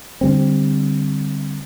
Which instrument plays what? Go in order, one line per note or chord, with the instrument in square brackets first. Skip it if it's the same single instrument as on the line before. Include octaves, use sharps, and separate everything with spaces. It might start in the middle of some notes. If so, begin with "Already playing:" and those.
[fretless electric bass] D3 G3 C4